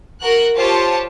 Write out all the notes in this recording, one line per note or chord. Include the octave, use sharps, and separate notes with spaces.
F#4 A#4 F#6
F4 G4 C5 C#5 A5